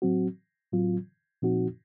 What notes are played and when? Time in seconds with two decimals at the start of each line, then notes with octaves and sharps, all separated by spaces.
0.02 A2 F#3 C4 F#4
0.72 A2 F#3 C4 F4
1.42 A#2 F3 C4 D#4 F#4